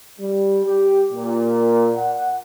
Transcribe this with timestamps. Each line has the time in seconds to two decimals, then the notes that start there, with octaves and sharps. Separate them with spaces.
0.19 G3
0.65 G4
1.13 A#2
1.96 F#5